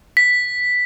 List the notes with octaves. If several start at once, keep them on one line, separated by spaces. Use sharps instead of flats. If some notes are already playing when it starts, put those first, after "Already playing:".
B6